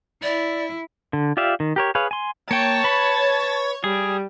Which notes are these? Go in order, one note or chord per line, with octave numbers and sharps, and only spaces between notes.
E4 D5
D3
F4 G4 D5 E5 F5
D#3
G4 A#4 C#5
G#4 B4 C#5 F5
G#5 C6
A#3 C#5 G5 A5
B4 B5
G3 G#4